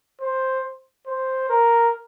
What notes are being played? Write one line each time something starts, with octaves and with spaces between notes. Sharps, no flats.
C5
C5
A#4